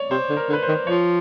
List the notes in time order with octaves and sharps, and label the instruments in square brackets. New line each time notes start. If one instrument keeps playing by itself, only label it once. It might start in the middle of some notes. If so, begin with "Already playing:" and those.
Already playing: [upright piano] C#5 D5
[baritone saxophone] C3 [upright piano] C5
[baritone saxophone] D3
[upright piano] A#4
[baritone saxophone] D3
[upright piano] B4
C5
[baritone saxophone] D#3
[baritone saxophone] F3 [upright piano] C#5